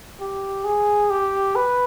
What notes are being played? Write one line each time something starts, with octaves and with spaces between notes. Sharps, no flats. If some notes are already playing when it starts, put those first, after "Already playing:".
G4
G#4
G4
B4